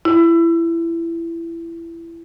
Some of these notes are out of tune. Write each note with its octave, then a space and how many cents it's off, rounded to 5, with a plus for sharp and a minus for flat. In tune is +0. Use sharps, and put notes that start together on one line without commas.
E4 +20